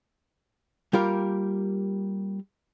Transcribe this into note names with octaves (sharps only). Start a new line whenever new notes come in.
G3 A#3 F4 G4 A#4